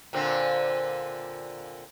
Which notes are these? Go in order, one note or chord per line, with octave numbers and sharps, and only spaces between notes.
A#2 D3 C4